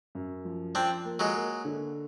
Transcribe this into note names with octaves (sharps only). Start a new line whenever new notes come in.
F#2
F3
F3 C4 D4
A#3
F#3 G#3
A#3
D3